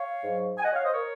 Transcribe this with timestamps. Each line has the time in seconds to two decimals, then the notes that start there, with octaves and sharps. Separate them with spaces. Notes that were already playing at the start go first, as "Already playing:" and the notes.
Already playing: C#5 F5
0.23 G#2 F#3
0.58 G#5
0.63 D#5 F#5
0.72 C#5 F5
0.83 C5 D#5
0.93 A#4 C#5